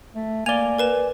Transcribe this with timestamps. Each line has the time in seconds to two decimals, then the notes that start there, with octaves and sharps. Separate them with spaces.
0.14 A3
0.46 A#3 D5 G#5 F7 G7
0.78 A#4 B4 E7